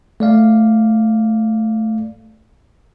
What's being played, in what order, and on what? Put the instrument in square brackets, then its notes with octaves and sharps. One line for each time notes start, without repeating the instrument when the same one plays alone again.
[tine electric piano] A3 D5 F5